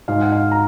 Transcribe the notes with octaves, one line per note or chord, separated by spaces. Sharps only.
G#2 F5
F#5
F5
A#5